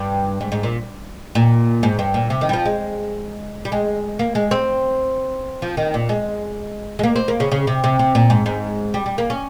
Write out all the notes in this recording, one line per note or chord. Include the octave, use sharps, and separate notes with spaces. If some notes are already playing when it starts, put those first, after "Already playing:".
Already playing: G2
G#2
G#2
A#2
A#2
G#2
G2
A#2
C3
D#3
G3
F3
G#3
G3
G#3
A#3
G#3
C4
F3
D#3
A#2
G#3
G#3
A#3
C4
A#3
C#3
C#3
C3
C3
C3
A#2
G#2
G#2
G3
G3
A#3
C#4